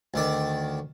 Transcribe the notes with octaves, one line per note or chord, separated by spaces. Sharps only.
D2 D#3 D5